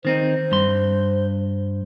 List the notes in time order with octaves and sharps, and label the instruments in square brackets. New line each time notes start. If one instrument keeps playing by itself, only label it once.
[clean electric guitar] D#3 C4 D#4 [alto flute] C5
[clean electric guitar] G2 C6